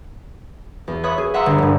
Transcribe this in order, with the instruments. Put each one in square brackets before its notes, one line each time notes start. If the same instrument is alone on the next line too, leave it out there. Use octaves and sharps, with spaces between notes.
[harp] E2
B4 C#5 E5 B5 D#6
G#4
E5 F#5 A#5 C6 E6
G1
A#1 G2